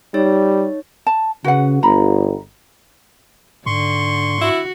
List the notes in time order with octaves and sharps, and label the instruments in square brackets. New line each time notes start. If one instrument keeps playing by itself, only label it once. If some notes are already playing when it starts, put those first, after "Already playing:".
[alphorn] G3 [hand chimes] D#4 C#5
[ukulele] A5
[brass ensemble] C#3 [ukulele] F#4 B4 F#5
[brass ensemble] G1 [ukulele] A#5 B5
[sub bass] G#2 [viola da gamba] D3 [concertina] C6 C#6
[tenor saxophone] E4 [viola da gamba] F#4